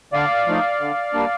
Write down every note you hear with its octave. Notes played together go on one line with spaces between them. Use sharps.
D3 D5 F5
F3 A3 D#4
D3
G3 A#3 D4